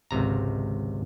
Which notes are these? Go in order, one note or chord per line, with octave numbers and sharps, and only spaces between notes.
G#1 C#2 C3 A#5